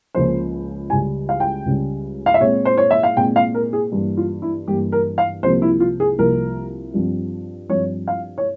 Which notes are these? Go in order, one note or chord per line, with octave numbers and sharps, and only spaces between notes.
C#2 C#3 F3 A#3 C5
C#2 C#3 G3 G#5
F5
G5
C#2 C#3 G3
F5
E5
A#2 G#3 C4 C#5
C5
C#5
E5
F5
A#2 G#3 C4 G5
F5
A#4
G#4
G2 E3 A#3
F4
E4
G2 E3 A#3 G4
A#4
F5
C2 C3 F3 A#3 C5
E4
F4
G#4
C2 C3 F3 A#3 A#4
G2 F3 C4
G2 F3 C4 C#5
F5
C#5